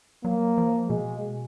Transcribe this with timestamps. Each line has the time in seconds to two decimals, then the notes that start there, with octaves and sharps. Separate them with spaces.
0.25 F#3 A#3
0.58 F3
0.89 B2 G#3